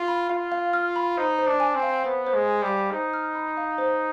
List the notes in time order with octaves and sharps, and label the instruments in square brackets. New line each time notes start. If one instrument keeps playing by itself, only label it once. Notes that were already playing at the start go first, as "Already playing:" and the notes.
Already playing: [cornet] F4 [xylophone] F6
[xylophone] B5
[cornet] F4 [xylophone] F5
[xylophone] F5
F6
B5
[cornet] D#4 [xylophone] C5
[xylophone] C5
[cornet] D4
[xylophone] G#5
[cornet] C4
[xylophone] F5
[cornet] B3 [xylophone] C5
[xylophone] C5
[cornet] G#3
[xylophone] G#5
[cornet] G3
[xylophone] F5
[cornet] D#4 [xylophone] C5
[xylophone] F6
B5
F5
C5